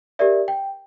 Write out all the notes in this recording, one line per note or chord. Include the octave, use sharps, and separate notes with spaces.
G4 A#4 D5 E5
G5